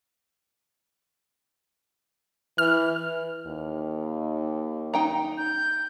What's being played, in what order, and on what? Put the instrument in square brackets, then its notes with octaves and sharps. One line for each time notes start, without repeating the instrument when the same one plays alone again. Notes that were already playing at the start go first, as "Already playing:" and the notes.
[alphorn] E3 [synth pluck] F6
[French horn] D#2
[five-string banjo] D#4 G5 A#5
[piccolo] G6